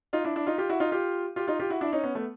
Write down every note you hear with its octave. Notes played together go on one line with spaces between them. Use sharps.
D#4 F4
D4 E4
D4 E4
D#4 F4
F4 G4
E4 F#4
D#4 F4
F4 G4
F4 G4
D#4 F4
F4 G4
E4 F#4
D4 E4
C#4 D#4
B3 C#4
A3 B3